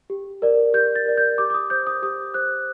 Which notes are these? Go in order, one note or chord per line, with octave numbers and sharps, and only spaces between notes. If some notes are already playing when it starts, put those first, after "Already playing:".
G4
A#4 D5
G4 G6
A6
A#4 D5
G6
G4 D6
D6
D#6
C5 G6
D#6
G4 D#6
C5 F#6